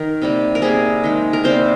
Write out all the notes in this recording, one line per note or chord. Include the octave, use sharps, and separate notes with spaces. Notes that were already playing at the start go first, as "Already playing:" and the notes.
Already playing: D#3 A#4
C3 G3 A#3
A#4
C3 G3 A#3 G#4
D#3 G#3
A#4
C3 G3 A#3 C5